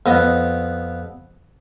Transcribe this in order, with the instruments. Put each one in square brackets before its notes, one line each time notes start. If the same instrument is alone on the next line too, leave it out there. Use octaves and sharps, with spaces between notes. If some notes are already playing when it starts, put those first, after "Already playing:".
[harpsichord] F2 B3 D#5